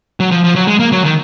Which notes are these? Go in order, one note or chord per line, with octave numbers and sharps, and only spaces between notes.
F#3
F3
F3
F#3
G#3
A#3
F#3
D#3